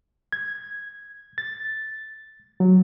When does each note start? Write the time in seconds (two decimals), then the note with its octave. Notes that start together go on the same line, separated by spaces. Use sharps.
0.33 G#6
1.38 A6
2.60 F#3